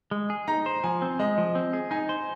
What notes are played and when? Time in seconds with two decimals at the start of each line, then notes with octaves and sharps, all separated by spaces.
0.11 G#3
0.30 G#4
0.48 D#4 A#5
0.66 C5
0.83 F3 G#5
1.02 C4
1.19 G#3 D#5
1.38 F3
1.55 C4
1.73 G#4
1.91 D#4 G#5
2.09 C5